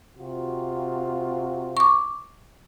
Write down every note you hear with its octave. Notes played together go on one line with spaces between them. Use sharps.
C3 F4 F#4
C#6 D6